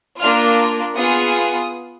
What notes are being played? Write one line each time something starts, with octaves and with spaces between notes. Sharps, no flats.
A#3 D4 F4 F6
B3 F4 G#4 D#6